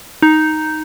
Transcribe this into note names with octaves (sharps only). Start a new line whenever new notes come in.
D#4